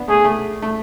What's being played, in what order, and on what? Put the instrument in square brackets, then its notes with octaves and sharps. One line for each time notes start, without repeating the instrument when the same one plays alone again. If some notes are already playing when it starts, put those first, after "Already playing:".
Already playing: [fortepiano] B3 D4
[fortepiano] A3 [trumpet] G#4
[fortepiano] A3
A3